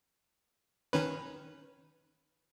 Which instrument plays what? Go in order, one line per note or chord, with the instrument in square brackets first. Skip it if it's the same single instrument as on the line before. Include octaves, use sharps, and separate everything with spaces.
[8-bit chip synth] D#3 C#4 B4